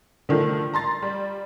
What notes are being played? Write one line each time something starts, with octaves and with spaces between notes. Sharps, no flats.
D3 D#3 F3 A3
A#5 C6 A6
G3